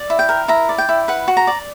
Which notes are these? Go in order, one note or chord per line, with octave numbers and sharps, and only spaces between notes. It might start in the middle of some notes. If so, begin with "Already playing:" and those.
Already playing: D5
E4
G5
A#4
E4 A#5
D5
G5
E4
B4 F#5
F#4
A#5
D5